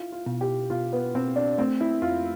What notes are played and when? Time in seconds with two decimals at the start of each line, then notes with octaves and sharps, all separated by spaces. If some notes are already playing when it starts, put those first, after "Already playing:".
Already playing: E4 F4
0.12 F4
0.26 B2
0.41 G4
0.70 B2 F4
0.93 B3
1.14 B2 C4
1.36 D4
1.58 A3 C4
1.81 E4
2.02 F2 F4